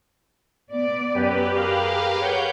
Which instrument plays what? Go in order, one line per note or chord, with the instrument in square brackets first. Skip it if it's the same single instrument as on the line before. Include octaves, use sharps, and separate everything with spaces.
[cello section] B3 D5
[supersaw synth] F#2 G4 B4
[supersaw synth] G4 B4 F5 [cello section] G#4 A#4
[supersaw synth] C#5 F#5 G6